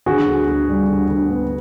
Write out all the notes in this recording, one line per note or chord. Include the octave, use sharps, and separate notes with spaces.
D3 F#4 G#4
D2
D2
G3
D2
D2
B3